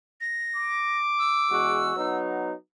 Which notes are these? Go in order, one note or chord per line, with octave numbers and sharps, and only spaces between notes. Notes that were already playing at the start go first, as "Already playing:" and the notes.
A#6
D6
E6
E2 G#3 F#4
F#3 B3 D#4